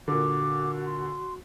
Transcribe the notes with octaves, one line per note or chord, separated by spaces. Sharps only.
A#2 D3 F#4 D6
C6